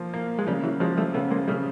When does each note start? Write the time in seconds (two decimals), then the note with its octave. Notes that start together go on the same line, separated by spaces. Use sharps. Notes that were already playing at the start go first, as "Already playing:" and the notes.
Already playing: F3 A#3
0.13 A#3
0.39 G#3
0.47 C#3 F3 G3
0.64 E3 F#3
0.80 F3 F#3 G#3
0.97 G3 A3
1.14 C#3 A3 B3
1.31 G#3 A#3
1.48 C#3 G3 A3